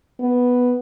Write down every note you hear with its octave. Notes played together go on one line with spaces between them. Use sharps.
B3